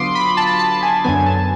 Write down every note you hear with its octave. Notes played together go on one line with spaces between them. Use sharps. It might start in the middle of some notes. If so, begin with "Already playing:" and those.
Already playing: D3 F#3 B3 F4 C6 D6 D#6
B5
A5
A5
G#5
F#2 D3 F#3 B3 G#5
A5